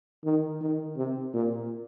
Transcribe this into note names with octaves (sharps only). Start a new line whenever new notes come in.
D#3
D#3
C3
A#2